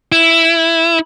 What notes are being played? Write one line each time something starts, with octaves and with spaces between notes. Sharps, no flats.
E4